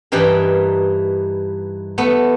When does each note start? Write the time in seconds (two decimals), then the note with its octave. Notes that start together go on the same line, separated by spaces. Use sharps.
0.12 G2 E3 D#4 G4 A#4
1.98 A3 B3